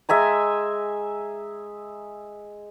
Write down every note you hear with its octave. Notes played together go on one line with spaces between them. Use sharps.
G#3 E5 G#5 A#5